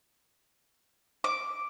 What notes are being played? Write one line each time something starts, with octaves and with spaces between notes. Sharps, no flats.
D6